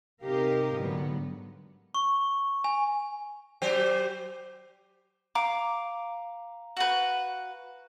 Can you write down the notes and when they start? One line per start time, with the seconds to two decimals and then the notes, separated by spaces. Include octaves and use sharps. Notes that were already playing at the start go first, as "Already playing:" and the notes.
0.23 C3 D#4 G4 A#4 D#5 F5
0.76 G#2 D3 F#3 B3
1.94 C#6
2.64 G#5
3.62 F#3 G4 C5
5.35 F5 A#5 D6
6.77 F#4 B4